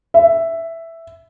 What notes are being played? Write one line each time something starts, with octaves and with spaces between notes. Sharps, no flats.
E5